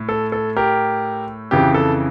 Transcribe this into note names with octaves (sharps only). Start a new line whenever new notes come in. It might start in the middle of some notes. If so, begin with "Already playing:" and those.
Already playing: A2
A4
A4
G4 A#4
F2 C#3 E3 G4
A4